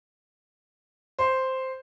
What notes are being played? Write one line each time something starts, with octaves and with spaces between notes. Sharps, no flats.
C5